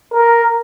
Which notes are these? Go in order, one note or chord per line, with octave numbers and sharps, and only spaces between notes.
A#4